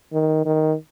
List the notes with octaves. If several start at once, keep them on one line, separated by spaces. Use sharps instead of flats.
D#3
D#3